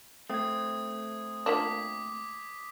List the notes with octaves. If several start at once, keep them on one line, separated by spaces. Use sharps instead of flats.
A3 C4 D#6 G#6
F3 A#3 D4 D6 B6